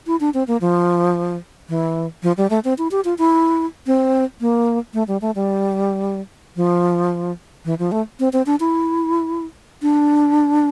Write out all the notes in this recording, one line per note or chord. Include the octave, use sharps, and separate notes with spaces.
E4
D4
C4
A#3
F3
E3
F3
G3
A3
C4
E4
G4
F4
E4
C4
A#3
A3
G3
A3
G3
F3
E3
F3
A3
C4
C4
D4
E4
D4